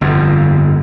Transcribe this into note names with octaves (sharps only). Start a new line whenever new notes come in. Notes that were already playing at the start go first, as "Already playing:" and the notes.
G1 F2